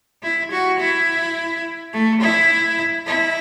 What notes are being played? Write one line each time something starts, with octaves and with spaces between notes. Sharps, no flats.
E4
F#4
E4
A3
E4
E4